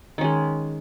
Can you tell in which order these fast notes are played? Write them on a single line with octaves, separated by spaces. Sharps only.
D#3 C#4 G#3